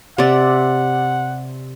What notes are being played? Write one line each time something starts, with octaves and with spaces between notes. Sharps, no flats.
C3 D5 F#5